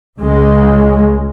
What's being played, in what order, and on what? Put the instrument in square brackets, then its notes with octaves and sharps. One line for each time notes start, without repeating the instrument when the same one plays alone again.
[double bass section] C#2 C#3 G#3